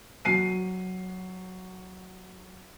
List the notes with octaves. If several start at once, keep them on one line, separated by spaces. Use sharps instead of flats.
F#3 C7 D#7